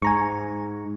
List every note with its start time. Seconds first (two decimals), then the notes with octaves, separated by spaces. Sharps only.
0.02 G#2 G#5 A#5 C#6